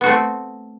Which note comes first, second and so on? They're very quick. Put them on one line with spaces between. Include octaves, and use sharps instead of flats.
B3 F#4 A3 C4